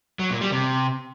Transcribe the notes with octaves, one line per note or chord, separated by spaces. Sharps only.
F#3
A#2
G3
C3